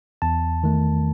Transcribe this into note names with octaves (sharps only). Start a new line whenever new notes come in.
E2 A5
D#3 A3